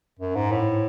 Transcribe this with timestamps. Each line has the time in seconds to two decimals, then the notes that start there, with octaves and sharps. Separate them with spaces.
0.19 F#2
0.35 G#2
0.52 A2